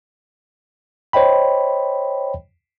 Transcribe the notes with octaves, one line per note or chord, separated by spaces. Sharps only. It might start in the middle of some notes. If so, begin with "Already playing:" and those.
C5 C#5 D#5 G5 B5